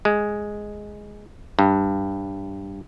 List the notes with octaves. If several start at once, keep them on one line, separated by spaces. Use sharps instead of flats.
G#3
G2